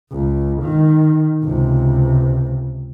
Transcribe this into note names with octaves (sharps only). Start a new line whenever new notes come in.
C#2
D#3
C#2 C3